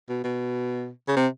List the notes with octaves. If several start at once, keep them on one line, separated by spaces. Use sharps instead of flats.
B2
B2
C#3
C3